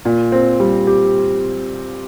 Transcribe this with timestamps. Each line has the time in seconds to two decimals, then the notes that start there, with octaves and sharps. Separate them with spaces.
0.05 A#2
0.32 C4
0.60 G3
0.87 G4